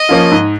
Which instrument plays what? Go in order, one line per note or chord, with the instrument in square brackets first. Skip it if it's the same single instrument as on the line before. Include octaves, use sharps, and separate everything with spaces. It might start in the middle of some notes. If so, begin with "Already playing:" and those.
Already playing: [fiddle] D#5
[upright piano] F3 A#3 C#4 F4
G#2